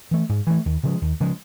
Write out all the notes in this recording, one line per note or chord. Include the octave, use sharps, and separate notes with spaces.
E3 A3
G#2
E3 A3
D#2
C#3 F3 G#3
D#2
C#3 F3 G#3